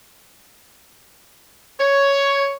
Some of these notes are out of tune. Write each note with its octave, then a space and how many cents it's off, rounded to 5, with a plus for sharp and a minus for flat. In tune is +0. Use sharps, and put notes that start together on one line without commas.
C#5 +5